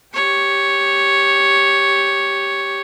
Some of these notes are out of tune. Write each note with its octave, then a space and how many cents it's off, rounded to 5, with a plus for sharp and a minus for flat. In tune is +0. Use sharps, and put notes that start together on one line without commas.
G4 +0 C#5 +0